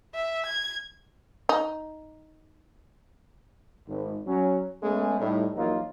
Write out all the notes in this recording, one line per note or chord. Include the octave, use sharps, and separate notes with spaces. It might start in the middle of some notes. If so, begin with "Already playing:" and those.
E5
G#6
D#4
G#1
F#3 C#4
G#3 A3 B3 C#4 G#4
A2 G3 D#4
A#1 E3 F#3 A#3 D#4 F4